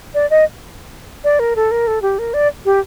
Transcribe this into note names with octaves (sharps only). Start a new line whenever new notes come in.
D5
D#5
D5
A#4
A4
A#4
A4
G4
A#4
D5
G4